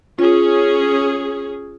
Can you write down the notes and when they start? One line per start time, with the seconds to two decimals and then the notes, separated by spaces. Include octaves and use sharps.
0.19 C#4 F4 G#4